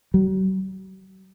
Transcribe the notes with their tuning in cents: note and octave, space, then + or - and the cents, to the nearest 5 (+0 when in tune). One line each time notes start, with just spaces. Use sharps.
F#3 +45